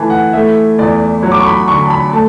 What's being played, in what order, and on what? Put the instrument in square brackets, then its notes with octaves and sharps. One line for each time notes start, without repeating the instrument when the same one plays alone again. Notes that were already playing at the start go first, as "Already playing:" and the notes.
Already playing: [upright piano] E3 A3 G#5 A5
F#5
A3 E5
E2 D5
F#3 C#5
D6
C#6
B5
D3 C#6
A5
B5
A3 A5